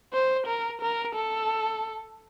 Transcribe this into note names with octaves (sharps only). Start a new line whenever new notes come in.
C5
A#4
A#4
A4